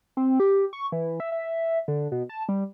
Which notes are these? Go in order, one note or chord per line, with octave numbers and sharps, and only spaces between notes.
C4
G4
C#6
E3
E5
E5
D3
B2
A5
G3